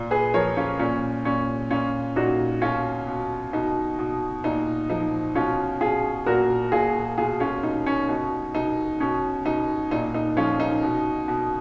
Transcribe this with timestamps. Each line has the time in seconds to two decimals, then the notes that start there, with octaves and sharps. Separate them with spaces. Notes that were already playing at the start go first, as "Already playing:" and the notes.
Already playing: A#2
0.11 G#4 B4
0.34 F3 A#4 C#5
0.57 C#4 F4
0.79 A#2 C#4
1.25 A#2 C#4
1.71 A#2 C#4 F4
2.16 A#2 D#4 F#4
2.62 B2 C#4 F4
3.07 B2
3.53 B2 D#4
3.99 B2
4.44 A#2 D#4
4.90 F3 D#4
5.35 B2 C#4 F4
5.81 B2 F4 G#4
6.26 A#2 F#4 A#4
6.72 A#2 F4 G#4
7.17 B2 F4 G#4
7.40 C#4 F4
7.63 B2 D#4
7.86 C#4
8.09 B2 D#4
8.55 B2 D#4
9.00 B2 C#4
9.45 B2 D#4
9.91 A#2 D#4
10.14 D#4
10.37 F3 C#4 F4
10.60 D#4
10.83 B2
11.28 B2